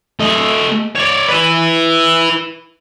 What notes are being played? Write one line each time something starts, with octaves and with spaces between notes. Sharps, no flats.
A3 D#5
C#5 D5
E4 B4